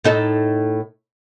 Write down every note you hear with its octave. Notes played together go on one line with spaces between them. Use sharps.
A2 D#4 A4